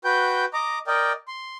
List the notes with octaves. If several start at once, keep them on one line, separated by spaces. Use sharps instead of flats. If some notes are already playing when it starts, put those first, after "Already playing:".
F#4 B4 G5 G6
D#5 A#5 D6
A#4 D5 D#5 G5
C6